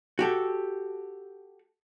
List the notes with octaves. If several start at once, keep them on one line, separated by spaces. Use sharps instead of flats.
F#4 G4 A4